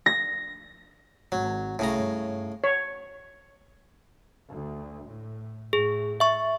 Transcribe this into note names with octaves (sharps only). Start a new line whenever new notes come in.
A#6
G#1 F#3
C2 A2 C#3 A#5
G2
C#5
D2
A2
A2 G#4
E5 C#6